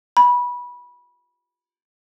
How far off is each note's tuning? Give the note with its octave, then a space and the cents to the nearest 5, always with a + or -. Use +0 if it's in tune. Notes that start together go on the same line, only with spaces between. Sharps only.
B5 -20